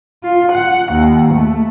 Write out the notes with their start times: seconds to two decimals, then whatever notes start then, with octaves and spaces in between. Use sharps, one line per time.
0.24 F4
0.52 F#5
0.93 D#2
1.34 A3